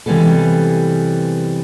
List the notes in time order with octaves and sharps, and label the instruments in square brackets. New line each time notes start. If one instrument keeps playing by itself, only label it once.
[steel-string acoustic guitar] C3 E3 G3 G#3 B3 A4